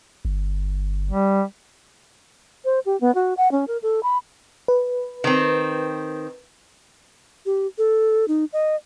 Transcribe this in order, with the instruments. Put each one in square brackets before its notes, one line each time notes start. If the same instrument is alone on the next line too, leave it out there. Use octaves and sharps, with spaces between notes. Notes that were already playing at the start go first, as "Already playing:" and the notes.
[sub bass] G1
[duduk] G3
[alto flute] C5
G4
B3
F#4
F#5
C#4
A#4
A4
B5
[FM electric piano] B4
[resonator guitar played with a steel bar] D#3 C4
[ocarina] G4
A4
D#4
D#5